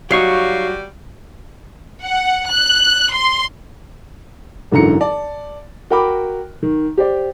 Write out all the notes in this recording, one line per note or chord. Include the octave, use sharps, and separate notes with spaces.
F#3 G3 D#4 F#4 G4 F5 C#6
F#5
F#6
C6
G#1 F#2 D3 E3 A#5 C#7
D5 A5
F#4 A#4 G5 B5 D6
D#3
G4 C5 D5